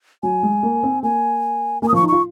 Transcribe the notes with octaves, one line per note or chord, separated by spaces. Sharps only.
F#3 G#5
G#3
A#3
C4
A#3 G#5
A#3 G#5
D#6
F3 C#6
D#4
F4 C#6